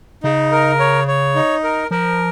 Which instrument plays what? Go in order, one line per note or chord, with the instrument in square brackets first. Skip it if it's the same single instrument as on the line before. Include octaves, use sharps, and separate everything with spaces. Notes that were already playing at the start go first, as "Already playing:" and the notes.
[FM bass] C#3 [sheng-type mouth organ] D#4
[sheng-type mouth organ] A#4
C#5
C#5
D#4
A#4
[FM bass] F3 [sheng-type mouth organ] A#4